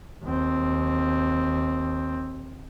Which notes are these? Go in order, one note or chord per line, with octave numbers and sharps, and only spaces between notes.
D#2 C4